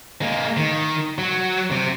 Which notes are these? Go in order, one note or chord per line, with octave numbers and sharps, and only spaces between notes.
G#3 A#3
D#3
F#3
C3